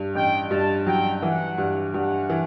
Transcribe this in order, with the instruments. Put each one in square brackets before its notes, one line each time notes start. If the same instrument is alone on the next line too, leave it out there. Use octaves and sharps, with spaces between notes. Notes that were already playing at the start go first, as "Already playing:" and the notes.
Already playing: [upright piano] G2
[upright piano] A1 [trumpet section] G5
[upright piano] G2 [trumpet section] A5
[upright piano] F#3 [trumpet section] G5
[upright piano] E3 [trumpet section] F#5
[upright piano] G2
[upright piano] G2 [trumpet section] F#5
[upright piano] E3